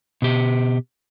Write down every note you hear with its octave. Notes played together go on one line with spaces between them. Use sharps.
B2 G4